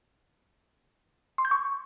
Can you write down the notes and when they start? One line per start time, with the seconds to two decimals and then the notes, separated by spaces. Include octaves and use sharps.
1.38 C6
1.45 G6
1.51 C#6